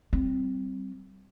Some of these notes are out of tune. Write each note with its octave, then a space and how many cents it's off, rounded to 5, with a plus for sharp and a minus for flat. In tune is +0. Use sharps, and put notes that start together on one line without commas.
G3 -30 C4 +0